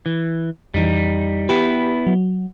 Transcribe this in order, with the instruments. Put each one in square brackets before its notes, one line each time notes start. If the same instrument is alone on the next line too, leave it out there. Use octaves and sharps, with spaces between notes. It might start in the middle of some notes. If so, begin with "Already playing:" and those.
[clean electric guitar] E3
[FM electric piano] F2 E3 [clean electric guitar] G3 D#4
[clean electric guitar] B3 E4 B4 [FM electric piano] G4
[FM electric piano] F#3